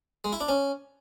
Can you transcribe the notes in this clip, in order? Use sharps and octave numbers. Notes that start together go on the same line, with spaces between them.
G#3
E4
D4
C#4